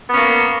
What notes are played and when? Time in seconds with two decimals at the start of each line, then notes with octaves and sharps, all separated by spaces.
0.09 B3
0.13 C#4
0.18 A#3